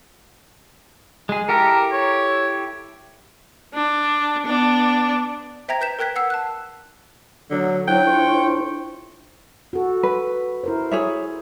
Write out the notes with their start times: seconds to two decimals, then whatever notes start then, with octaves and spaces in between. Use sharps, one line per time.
1.29 G#3 G#4
1.49 E4 G4 A4 A#4
1.93 C#5
3.75 D4
4.46 B3 D4
5.68 C5 E5 G5 A#5 G#6 A#6
5.81 B4 G6 B6 E7
5.99 A#4 G5 F#6 G#6 B6
6.16 F#5 E6 C7
6.30 A5 F#6
7.51 D3 F#3
7.88 F#3 D4 E4 C5 G5
8.07 A2 F4 C#6
9.73 F#4 A4
10.03 B4
10.64 E4 A#4 C5
10.91 G#4 C#5 E5